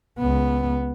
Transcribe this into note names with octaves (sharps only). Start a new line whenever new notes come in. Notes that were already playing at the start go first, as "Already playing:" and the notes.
C#2 B3